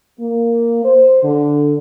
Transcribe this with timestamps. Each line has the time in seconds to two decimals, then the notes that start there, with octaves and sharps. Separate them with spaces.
0.20 A#3
0.84 C5
1.23 D3